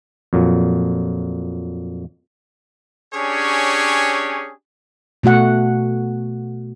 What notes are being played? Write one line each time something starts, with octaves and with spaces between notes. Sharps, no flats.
F2 A#2 F#3
C#4 D4 G4 G#4 C#5
B2 A3 F#4 F#5